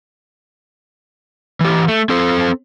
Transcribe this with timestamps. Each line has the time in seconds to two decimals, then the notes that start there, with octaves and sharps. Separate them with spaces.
1.61 E3 G4
1.88 A3
2.09 C4 A4 C5